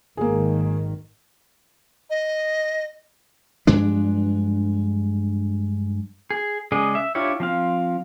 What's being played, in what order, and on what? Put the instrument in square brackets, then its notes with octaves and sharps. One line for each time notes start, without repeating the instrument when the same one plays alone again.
[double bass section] G#1 D#3 [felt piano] A#3 G#4
[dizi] D#5
[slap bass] G2 F3 G#3 D4
[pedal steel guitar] G#4
C#3 G#3 G#4 D5 D#5
E5
D4 E4 F4 G4 C#5
F3 C4 F5